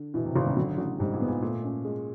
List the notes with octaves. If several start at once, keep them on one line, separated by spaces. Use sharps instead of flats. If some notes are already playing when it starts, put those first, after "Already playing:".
Already playing: D3
B2 E3
C3
G#1 C3
C#3
D3 F#3
A1
G#2 G3
A#2
B3
A#2
A#2 A3
C#4
G#3